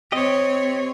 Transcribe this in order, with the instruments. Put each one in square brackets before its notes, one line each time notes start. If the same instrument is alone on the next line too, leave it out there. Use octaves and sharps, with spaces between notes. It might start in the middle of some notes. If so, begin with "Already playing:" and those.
[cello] C4 C#5 [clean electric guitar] G4 D#5